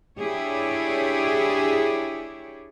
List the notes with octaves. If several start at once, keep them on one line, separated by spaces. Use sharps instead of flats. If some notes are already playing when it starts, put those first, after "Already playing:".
D4 E4 G4 G#4 C#5